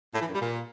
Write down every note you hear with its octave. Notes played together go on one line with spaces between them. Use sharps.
A2
E3
F#2
G3
A#2